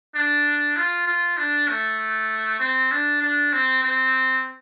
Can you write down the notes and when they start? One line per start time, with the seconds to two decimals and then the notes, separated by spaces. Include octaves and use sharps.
0.15 D4
0.77 F4
1.07 F4
1.38 D4
1.69 A3
2.60 C4
2.91 D4
3.22 D4
3.53 C4
3.83 C4